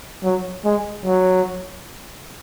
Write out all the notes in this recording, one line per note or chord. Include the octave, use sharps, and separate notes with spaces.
F#3
G#3
F#3